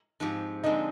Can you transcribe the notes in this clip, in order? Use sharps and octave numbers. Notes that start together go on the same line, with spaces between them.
G#2 F3 C4 G4
D3 F3 G#3 C4 D#4